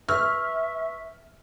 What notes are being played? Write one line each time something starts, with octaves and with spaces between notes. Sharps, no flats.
B4 E5 C#6 E6 F6